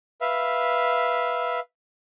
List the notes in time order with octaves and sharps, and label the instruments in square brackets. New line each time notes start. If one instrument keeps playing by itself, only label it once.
[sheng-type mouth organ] B4 E5 F5